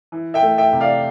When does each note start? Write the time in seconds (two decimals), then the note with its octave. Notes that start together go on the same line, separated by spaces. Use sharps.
0.12 E3
0.34 E5 G5
0.42 A3
0.58 E5 G5
0.73 C3
0.80 D5 F5